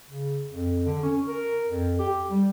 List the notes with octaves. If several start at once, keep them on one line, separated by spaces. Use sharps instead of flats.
C#3
F2
D3
C#4
A#4
F2
G4
G3